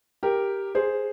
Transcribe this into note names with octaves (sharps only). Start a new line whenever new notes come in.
G4 A#4
G#4 C5